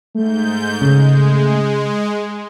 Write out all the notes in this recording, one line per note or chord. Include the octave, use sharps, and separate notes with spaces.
G#2 A3 G6
C#3 G#3